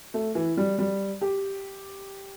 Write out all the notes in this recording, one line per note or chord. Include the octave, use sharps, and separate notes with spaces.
A3
E3
G3
G3
G4